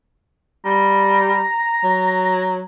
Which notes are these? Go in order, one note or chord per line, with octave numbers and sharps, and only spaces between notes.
G3 A#5
F#3